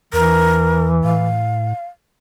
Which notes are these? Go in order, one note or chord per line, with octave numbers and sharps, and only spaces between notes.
E2 E3 A#4
A2 F5